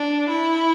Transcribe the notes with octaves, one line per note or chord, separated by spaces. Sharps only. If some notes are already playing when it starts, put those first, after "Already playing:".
Already playing: D4
E4